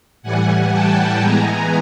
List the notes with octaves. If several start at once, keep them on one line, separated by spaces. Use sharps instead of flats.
A2 E3 G3 F#5 G#5
G5 A5
E3 G#3 B3 G#5 A#5